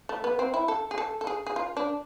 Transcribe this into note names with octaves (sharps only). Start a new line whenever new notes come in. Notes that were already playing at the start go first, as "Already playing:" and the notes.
A3
B3
C4
E4
A4
G#4
A4
A4
G#4
G#4
F4
D4